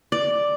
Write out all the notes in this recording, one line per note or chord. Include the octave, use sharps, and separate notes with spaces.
D5